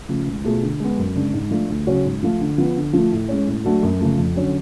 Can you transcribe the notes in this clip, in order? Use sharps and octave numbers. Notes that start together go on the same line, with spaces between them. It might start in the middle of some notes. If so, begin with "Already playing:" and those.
C#3 F3 A3
C#2
B2 A3 F4 G#4
D3
G#3 B3
F#2
C#3 G#3 D4
G#2
F3 A3 D4 F4
D2
C#3 F#3 C#4 F#4
G#2
F3 A3 F4
D3
F3 B3
D3
F3 A3
A2
G#3 C#4
A2
F#3 A3 D4 F#4
F#2
C#3 F3 A3
F2
D3 F#3 C#4